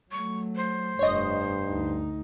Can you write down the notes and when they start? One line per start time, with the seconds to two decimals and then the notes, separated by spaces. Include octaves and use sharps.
0.12 F#3 A3 C#6
0.56 C5
0.99 F1 G2 C#5 D#5
1.69 D2 D#4